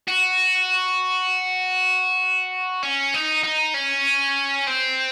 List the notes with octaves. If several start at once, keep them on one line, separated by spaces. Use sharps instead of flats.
F#4
C#4
D#4
D#4
C#4
C4